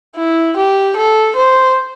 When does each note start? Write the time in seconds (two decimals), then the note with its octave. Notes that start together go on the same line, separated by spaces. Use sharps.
0.16 E4
0.56 G4
0.96 A4
1.36 C5